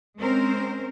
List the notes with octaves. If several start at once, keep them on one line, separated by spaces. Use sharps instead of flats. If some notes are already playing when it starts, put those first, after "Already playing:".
G#3 C4 C#4 A#4 C5